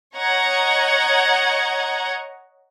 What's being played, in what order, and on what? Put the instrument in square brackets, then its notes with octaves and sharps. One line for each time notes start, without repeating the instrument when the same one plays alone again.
[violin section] C#5 D#5 F#5 A#5 C#6 G#6